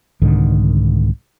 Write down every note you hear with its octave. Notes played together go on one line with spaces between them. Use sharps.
C2 G#2 D3 D#3